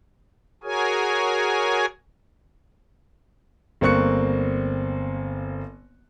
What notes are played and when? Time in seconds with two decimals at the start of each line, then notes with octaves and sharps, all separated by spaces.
0.64 F#4 G#4 A#4 C#5 G#5
3.81 G1 A#3 C4 C#6 F#6 C#7